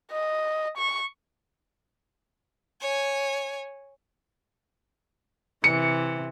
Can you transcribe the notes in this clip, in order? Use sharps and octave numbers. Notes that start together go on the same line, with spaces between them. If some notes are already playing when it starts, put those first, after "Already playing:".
D#5
C#6
C#5 G#5
C3 E3 C#7